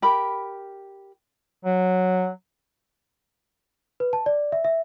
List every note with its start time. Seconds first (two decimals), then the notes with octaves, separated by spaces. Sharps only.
0.02 G4 A#4 B5
1.65 F#3
4.00 B4
4.13 A5
4.26 D5
4.52 E5
4.65 E5